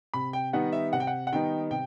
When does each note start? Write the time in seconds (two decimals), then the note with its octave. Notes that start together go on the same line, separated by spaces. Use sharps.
0.14 C3 B5
0.33 G5
0.53 D#3 G3 B3 D#4 F#5
0.72 E5
0.93 C3 F#5
1.00 G5
1.07 F#5
1.27 F#5
1.33 D#3 G3 B3 D#4 G5
1.71 C3 G5